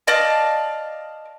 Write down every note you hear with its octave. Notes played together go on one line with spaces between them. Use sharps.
D5 D#5 F5 A5